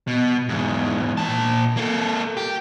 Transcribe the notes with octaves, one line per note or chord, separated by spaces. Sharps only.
B2
E2 G#2
A#2 A5
A#3 A4
G4